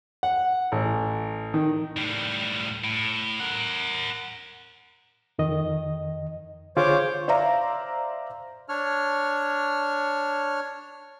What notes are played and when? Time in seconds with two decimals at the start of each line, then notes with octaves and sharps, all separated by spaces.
0.23 F#5
0.72 A1
1.54 D#3
1.97 A2 G3
2.84 A2
3.40 A#4 F#5
5.39 F2 D#3 D#5
6.77 D3 F4 G#4 C5 C#5 D6
7.28 C5 D5 E5 F5 A#5
8.69 D4 C#5 F6